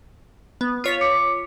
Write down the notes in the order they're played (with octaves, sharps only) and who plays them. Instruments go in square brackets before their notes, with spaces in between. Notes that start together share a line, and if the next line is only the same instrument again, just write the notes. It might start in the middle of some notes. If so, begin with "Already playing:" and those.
[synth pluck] B3
F4 C#5 B6
[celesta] D6 C#7